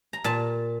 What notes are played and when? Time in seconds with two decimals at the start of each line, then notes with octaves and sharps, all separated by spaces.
0.13 A#5
0.24 A#2 A5